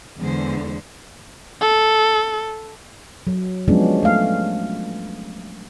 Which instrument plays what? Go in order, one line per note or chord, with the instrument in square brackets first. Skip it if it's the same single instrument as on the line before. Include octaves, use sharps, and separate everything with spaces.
[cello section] E2 D3 [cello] G#3 C5
[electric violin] A4
[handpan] F#3
F3 F#3 G#3 B3 C#4 D4
A3 F5